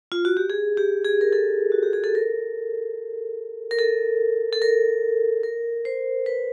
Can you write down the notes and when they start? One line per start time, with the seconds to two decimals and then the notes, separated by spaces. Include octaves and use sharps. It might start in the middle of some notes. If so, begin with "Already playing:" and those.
0.12 F4
0.25 F#4
0.37 G4
0.50 G#4
0.77 G4
1.04 G#4
1.21 A#4
1.33 A4
1.72 F#4
1.83 G4
1.93 G#4
2.04 A4
2.15 A#4
3.71 A#4
3.79 A4
4.53 A4
4.62 A#4
5.43 A#4
5.85 C5
6.26 B4